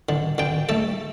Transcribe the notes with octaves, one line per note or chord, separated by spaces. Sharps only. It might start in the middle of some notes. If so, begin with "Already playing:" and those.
D3
D3 G5
A3 A4